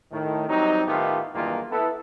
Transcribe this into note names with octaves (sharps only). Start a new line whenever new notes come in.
A2 D#3
F#3 G3 C4 D#4
A2 D#3 A3 B3 F4 G4
B1 E2 G2 D#3 A#3 F4
B3 E4 A4